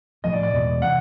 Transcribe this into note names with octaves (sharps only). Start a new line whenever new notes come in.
A2 F3 A3 D#5
D5
D5
E2 B2 G#3 B3
C3 E3 F#5